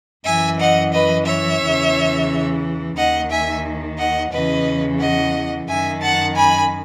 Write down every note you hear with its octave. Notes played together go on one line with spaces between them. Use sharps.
F#2 E3 E5 G#5
D#5 F#5
B4 D#5
C#5 E5
E2 C#3 E3
D#2 D#3 D#5 F#5
E5 G#5
D#5 F#5
E2 C#3 E3 B4 D#5
D#5 F#5
F#2 D#3 E5 G#5
F#5 A5
G#5 B5